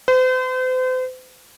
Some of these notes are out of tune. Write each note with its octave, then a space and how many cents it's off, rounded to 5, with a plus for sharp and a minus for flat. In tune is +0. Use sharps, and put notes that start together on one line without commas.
C5 -40